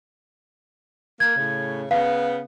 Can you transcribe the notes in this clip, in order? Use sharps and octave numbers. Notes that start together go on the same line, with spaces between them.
A#3 G#6
A2 C#3
C#3 B3 F5